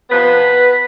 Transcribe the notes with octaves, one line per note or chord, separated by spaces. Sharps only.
C3 F3 B3 B4